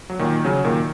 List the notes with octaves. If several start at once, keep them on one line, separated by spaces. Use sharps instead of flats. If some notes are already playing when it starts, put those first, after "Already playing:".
F#3
A#2 D#3
C#3 F#3
A#2 D#3